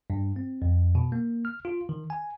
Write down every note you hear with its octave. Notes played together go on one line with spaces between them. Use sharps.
G2
C4
F2
B2
A#3
F6
F4
D#3
G#5